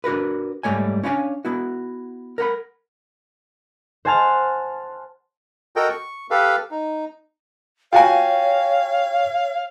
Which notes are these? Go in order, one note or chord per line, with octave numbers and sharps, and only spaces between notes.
D4 F#4 A#4 B4
G#2 G3 A3 C#5 G#5
C#4 D4 E4 C#5 F5 G#5
B3 E4 F#4
A#4 F#5 B5
C5 F#5 G#5 A5 C6 F6
F#4 A4 A#4 D#5 G5
C#6
G4 A4 B4 F5
D#4
F4 F#4 C#5 F5 G5 G#5